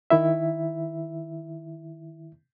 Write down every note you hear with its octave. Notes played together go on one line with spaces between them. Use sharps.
D#3 E4 E5